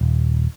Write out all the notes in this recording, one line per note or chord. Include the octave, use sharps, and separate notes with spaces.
D#1